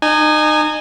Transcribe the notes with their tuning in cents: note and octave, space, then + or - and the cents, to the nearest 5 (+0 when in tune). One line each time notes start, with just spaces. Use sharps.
D#4 -30 G#5 +0